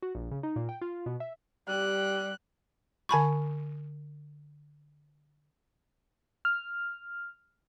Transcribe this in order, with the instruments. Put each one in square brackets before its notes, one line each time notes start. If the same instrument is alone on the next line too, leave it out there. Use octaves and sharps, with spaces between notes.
[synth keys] F#4
A#1
C#3
D#4
A#2
G5
F4
B2
E5
[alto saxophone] G3 [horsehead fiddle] G4 [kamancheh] F#6
[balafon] D3 G#5 B5 C#6
[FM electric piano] F6